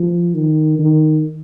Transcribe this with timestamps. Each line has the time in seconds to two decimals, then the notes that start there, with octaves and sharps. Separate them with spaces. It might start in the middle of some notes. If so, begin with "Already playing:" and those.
Already playing: F3
0.34 D#3
0.79 D#3